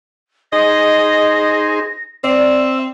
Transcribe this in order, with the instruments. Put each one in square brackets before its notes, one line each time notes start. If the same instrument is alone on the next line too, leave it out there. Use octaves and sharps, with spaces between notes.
[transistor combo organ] D#4 G#4 C5 [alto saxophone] D#5 [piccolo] A#6
[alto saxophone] C4 [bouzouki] D5 [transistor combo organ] E5